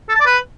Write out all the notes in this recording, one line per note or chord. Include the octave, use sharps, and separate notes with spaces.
A4
A5
D5
B4